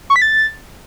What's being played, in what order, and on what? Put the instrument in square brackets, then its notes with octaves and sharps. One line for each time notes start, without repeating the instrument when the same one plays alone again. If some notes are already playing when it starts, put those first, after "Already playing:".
[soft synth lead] C#6
B6
A6